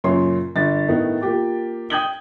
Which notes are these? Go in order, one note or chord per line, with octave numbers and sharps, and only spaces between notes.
F#2 A#2 C#3 C#5 C6
G1 A6
A2 D#3 B3 D#4 E4
A#3 F4 G4 D6
G5 D#6 G6 G#6 F#7 G7